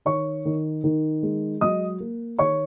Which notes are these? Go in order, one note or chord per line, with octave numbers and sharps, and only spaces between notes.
D#3 C#5 C#6
D#3
D#3
G#3
F#3 D#5 D#6
A#3
D#3 C#5 C#6